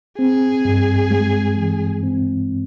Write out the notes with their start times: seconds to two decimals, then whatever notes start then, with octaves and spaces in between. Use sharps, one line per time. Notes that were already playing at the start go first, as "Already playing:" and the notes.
0.19 C4 G#4
0.65 G2
1.11 G#3
1.57 E3
2.03 C4